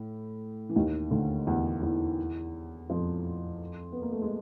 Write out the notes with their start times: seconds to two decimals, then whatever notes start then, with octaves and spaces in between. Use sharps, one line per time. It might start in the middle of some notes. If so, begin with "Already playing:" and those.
Already playing: A2
0.69 E3
0.76 D#2 D#3
1.11 D2 D3
1.47 E2 E3
1.82 E2 E3
2.89 F2 F3
3.92 B3
4.02 A#3
4.12 A3
4.22 G#3